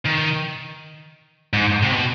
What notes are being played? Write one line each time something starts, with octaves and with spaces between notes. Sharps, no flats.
D#3
G#2
C3
B2